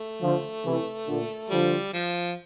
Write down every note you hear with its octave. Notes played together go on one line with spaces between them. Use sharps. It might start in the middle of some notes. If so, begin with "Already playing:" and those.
Already playing: A3
D3 F3
C3 E3
A#2 D3
D3 F3 G3
F3